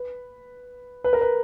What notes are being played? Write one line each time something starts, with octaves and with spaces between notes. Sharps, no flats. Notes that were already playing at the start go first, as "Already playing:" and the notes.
Already playing: B4
B4
A#4
B4